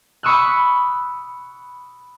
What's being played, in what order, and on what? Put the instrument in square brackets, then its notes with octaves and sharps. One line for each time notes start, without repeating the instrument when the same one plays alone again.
[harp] B5 C#6 D#6 E6 F#6